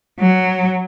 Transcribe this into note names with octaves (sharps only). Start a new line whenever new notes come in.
F#3